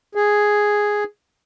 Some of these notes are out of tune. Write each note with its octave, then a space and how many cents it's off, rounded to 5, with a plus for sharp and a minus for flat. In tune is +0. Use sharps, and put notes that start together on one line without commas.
G#4 +0